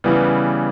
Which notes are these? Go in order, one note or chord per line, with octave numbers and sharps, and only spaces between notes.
C#3 E3 G3 B3